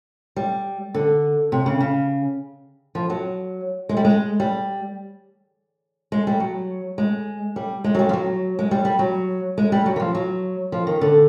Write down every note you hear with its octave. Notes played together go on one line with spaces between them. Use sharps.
G3
D3
C3
C#3
C#3
F3
F#3
G#3
G3
G#3
G3
G#3
G3
F#3
G#3
G3
G#3
F#3
G3
F3
F#3
G#3
G3
G3
F#3
G#3
G3
F#3
E3
F3
F#3
F3
D#3
D3